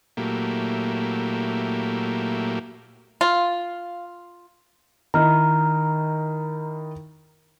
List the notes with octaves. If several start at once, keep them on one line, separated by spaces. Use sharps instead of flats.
A#2 F#3 A3 A#3 E4 G4
F4 F5
D#3 D#4 E4 A#5 F6